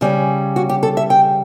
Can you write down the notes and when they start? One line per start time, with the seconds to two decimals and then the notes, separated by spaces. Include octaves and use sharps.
0.01 C#3 G3 C#4
0.56 F#4
0.69 G4
0.83 A4
0.97 E5
1.10 G5